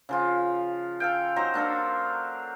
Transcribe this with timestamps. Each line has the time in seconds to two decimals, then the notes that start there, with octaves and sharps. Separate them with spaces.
0.09 C#3 F3 F4
1.00 A4 F5 G5
1.36 F#3 D#4 C5 A#5
1.54 A#3 D4 A4 A#4